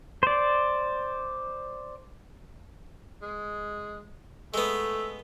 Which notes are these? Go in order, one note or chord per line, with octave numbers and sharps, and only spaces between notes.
C5 D5
G#3
G#3 A3 B3